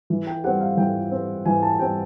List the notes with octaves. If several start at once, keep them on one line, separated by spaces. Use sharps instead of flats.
E3
G5
G3 C4 F#5
F5
E3 G5
G3 C4
E3 G#5
A5
G3 C4 G5